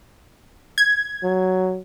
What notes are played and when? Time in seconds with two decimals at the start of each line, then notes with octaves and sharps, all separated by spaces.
0.78 G#6
1.23 F#3